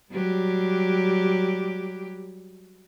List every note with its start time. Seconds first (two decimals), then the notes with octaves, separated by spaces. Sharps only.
0.12 F#3 G3 G4